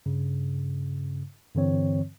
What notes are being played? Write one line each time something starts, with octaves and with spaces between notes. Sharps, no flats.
G2 C#3
G2 D3 E3 C4 C#5